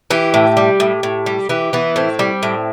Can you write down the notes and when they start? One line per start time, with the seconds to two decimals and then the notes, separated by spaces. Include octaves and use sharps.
0.10 E3 G4
0.34 A2
0.57 G3
0.80 A2
1.03 A2
1.26 G3
1.49 E3 G4
1.73 E3 B3
1.96 A2 C4
2.19 G3
2.43 A2